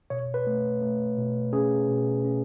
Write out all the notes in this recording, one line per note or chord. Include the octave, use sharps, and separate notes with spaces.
B2 C#5
B4
A3
A3
B2
C#4 G#4
B2
C#4